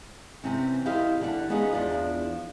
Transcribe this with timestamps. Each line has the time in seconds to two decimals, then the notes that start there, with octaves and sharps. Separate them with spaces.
0.44 C3 E3 C4 C#4
0.86 E4 G4 A#4 C5 D#5 F5
1.21 D3 E3 A4 D5 F#5
1.50 B3 C#4 D#4 F4 F#4 G#4
1.73 E2 F3 D4 F4